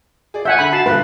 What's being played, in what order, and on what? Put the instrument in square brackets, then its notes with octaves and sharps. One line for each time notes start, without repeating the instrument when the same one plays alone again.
[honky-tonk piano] G#4 D5
[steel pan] E5 F#5 G#5 [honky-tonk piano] G6
[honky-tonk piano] D3 [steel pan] B5
[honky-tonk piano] F#4 F#5 C7 [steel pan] A5
[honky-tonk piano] G2 A#2 D3 [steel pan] B4